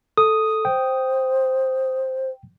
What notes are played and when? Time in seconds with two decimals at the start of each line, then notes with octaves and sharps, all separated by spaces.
0.17 A4 D#6
0.65 C5 G5